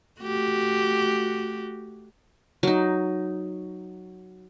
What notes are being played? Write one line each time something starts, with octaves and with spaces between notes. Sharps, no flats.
A3 F#4 G4
F#3 D#4